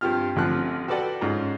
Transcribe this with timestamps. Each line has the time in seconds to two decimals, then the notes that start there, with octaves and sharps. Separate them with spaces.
0.01 G2 C4 F4 G4 F6
0.36 A1 D3 F3 C4 F#6
0.88 F#4 A4 B4 D5 F#5 G5
1.21 G#2 C#4 F4 A#5